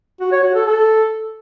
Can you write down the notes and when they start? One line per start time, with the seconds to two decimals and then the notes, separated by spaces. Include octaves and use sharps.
0.21 F#4
0.32 C#5
0.43 F#4
0.55 A4
0.66 A4